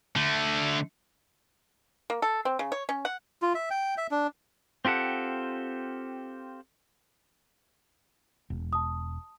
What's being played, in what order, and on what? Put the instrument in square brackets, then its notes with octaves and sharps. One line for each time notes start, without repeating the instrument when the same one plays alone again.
[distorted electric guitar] D3 A3
[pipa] A#3
A4
C4
C#3
C#5
C#4
F#5
[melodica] F4
E5
G5
E5
D4
[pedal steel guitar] C4 F4 G4 A4 F#5
[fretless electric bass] E1
[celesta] A5 D#6